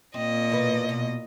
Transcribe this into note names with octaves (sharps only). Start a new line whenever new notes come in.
A#2 C4 D#5
E2 B2 B4
B2